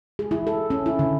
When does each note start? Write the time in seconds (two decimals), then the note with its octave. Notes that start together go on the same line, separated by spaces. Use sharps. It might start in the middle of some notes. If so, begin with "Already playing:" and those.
0.19 G#4
0.31 E4
0.47 A4
0.70 C#4
0.86 E4
0.99 D3